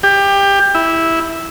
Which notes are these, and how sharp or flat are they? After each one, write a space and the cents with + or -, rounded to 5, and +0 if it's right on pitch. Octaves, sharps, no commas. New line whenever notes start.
G4 +20
E4 -10